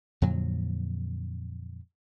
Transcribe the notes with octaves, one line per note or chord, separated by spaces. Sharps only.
F2 A#2 D3 F#3